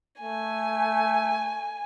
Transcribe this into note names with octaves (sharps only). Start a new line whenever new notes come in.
A3 G#5